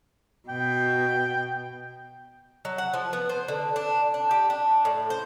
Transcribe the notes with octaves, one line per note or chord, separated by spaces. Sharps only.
B2 G5
F#3
F#5
F3
B3
C5
D3
D4
D4
G4
D4
A2
C5